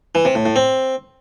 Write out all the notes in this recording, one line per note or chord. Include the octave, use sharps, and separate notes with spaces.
E3
C3
A2
A2
C4